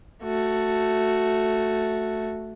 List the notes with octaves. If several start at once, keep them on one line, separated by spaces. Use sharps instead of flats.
A3 F#4